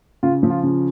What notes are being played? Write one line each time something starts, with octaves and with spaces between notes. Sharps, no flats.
C#3 F4
F3
F4
C#3